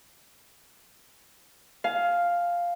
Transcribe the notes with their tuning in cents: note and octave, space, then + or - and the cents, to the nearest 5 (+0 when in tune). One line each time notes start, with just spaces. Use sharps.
F5 +0 G#5 +30